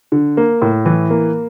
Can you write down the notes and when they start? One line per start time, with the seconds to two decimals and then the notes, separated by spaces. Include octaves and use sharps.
0.12 D3
0.37 A#3
0.62 A2
0.86 E3
1.10 A#3